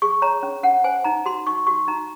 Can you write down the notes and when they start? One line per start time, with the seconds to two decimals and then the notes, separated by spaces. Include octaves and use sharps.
0.02 G#4 C#6
0.22 C#5 A#5
0.43 C#4
0.63 C#4 F#5
0.84 C5 G#5
1.04 D#4 A#5
1.26 F#4 C6
1.47 D#4 C#6
1.67 F#4 C#6
1.88 D#4 A#5